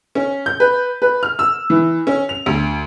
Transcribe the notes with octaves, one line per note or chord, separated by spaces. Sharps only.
C#4
G6
B4
B4
F6
E6
E3
C#4
F7
D2